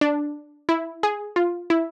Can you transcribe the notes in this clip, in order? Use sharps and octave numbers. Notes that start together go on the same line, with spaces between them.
D4
E4
G#4
F4
E4